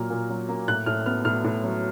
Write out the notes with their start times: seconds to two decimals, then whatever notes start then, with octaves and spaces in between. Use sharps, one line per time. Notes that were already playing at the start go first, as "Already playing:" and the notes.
Already playing: A#2 F#3 A#3 F6
0.10 A#2
0.29 F#3
0.49 A#3
0.68 A2 F#6
0.86 A2 F6
1.06 B3 F6
1.25 A2 F6
1.44 A2
1.64 F#3